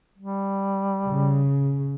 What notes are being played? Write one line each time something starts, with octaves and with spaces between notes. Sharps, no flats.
G3
C#3